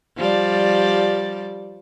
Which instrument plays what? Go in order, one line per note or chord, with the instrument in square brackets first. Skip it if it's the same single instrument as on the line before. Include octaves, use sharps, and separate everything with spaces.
[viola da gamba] F3 G3 D5